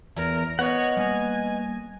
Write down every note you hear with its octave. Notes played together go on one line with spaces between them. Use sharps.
E2 A#4
B3 C#5 D#5 F#5
G3 A3 A#3 G#5